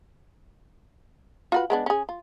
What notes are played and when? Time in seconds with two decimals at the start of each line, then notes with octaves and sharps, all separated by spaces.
1.52 F4 F#4 B4
1.70 G#3 B3 D4
1.86 C#4 G#4
2.09 F4